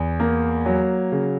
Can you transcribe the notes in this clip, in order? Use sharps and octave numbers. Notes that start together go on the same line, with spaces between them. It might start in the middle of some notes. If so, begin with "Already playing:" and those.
Already playing: E2
A#3
F#3
C#3